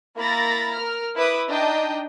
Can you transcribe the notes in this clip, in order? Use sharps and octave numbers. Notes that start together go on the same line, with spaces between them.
A#3 E4 A#5 B5 A6 A#6
A#4 F6
E4 B4 E5 D6 D#6
D4 D#4 D#5 G5